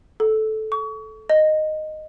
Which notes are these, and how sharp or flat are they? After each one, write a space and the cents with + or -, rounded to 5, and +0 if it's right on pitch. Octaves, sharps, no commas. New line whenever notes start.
A4 -15
C#6 +35
D#5 -10